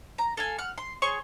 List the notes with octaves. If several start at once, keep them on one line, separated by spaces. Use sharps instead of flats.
A#5
A4 F5 G#5
F#5 F6
C6
G#4 C#5 C6 C#6